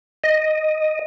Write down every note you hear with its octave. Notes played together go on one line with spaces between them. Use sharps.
D#5